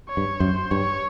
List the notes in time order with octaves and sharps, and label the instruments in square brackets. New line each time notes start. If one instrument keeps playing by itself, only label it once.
[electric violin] C#5
[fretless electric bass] G2
[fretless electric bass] F#2 [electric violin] C5
[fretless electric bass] G2 [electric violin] C#5